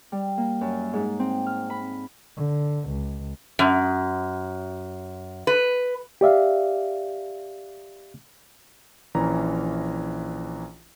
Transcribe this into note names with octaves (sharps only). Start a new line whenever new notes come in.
G3
A#3
F#2
G#2
C4
F6
B5
D3
C#2
F#2
B4
G4 D5 E5 F5
A#1 E3 C#4 A#5